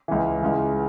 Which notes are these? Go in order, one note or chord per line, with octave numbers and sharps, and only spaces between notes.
C#2 C#3 E3
C#2 C#3 E3